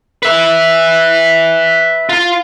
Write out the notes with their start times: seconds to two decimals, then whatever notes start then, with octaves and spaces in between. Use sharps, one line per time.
0.23 B4 E5
2.09 F4